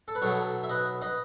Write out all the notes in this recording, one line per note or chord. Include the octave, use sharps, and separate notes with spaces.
A4
B4
B1 B2 F#3 A4 C#5
E5
B4 D#5
B4 D#5